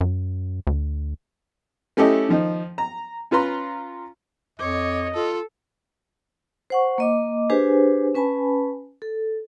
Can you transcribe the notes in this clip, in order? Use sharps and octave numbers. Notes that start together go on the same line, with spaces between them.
F#2
D2
A3 C#4 E4 G4 A4 D#5
D#3 F3 D#4
A#5
C#4 F4 B4 A#5 C6
F2 C#5 D#5 D6
F4 A4
C5 F#5 C#6
A#3 D#5 D6
D4 G4 G#4 B4 C5 G#5
C#4 B4 G#5 A5 B5
A4